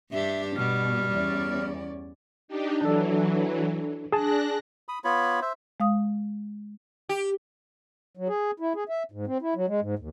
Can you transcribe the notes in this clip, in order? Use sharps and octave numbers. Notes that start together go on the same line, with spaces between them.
G2 D4 G4 E5
B2 G3 F6
E2 C#4 D5
D4 D#4 G4
E3 F#3 D4 A4
D4 G#4 A5 F#6 A#6
B5 D#6
B3 F4 C#5 B5
C5 E5
G#3 F5 D#6
G4
F#3
G#4
E4
G#4
E5
G#2
C4
E4
F#3
G#3
G#2
D#2